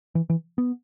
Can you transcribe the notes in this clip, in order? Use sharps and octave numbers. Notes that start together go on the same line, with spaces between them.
E3
E3
B3